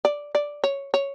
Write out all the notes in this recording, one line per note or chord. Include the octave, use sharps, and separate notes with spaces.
D5
D5
C#5
C#5